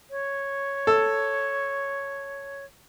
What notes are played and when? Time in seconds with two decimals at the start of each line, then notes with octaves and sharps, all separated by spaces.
0.10 C#5
0.87 A4